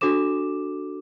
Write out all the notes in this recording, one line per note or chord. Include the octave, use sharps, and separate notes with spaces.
D4 F#4 A4 D6 E7